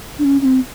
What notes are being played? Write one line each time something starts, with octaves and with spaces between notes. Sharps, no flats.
D4
C#4
C#4
C4